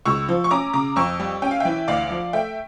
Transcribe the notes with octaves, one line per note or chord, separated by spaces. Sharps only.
C#2 C#6 E6
F3
C#6
C#4 A#5 D6
C#3 A#5 D6
F2 C#6 E6
G3
C#4 G5
F5
E3 E5 G5
D2 D5 F5
F3
A3 E5 G5